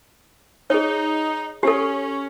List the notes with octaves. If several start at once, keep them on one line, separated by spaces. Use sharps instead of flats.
D#4 G#4 C#5
C#4 G4 A4